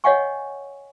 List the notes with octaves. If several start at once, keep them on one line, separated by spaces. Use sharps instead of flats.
C#5 D#5 F5 F#5 G#5 C#6